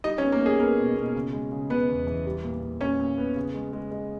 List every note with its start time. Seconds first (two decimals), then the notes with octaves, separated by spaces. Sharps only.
0.04 G3 D#4 D#5
0.18 C#4 C#5
0.22 B3
0.32 A#3 A#4
0.42 B3 G#4
0.59 A#3 B3 A#4
0.78 B2
0.96 B2
1.16 C#3
1.33 G#3
1.52 C#3
1.70 C#3 B3 B4
1.89 E2
2.07 E3
2.26 G3
2.44 A#2
2.63 A#2
2.81 A#2 C#4 C#5
3.00 A#2
3.18 B3
3.36 C#3
3.54 G#3
3.73 G#3
3.91 G#3